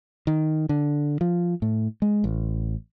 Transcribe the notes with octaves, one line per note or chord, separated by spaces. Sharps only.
D#3
D3
F3
A2
G#3
A1